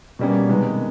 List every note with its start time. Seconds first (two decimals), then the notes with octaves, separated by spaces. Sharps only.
0.19 B2 G3 A#3 C#4
0.49 C3 D#3 G#3 B3